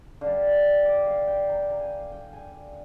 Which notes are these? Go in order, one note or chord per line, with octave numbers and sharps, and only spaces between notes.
D3 G3 F5
D5
F5
G5
A#5
A#5
G#5
G5
G#5